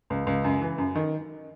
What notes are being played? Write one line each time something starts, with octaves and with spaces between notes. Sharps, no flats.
C#2
C#2
F#2
E3
F#2
D#3